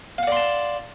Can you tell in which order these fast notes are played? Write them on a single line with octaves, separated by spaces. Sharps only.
F5 F#5 D5 C6 A5